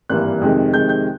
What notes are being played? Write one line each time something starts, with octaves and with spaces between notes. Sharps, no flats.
G#1 G2 E3 G3 A#3 F#6
F2 C3 D#3 G#3
F2 C3 D#3 G#3 G6
G6